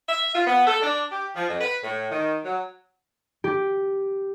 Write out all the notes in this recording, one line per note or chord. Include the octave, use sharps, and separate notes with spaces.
E5
F4
B3
A4
D4
G4
F3
F2
B4
A2
D#3
F#3
G4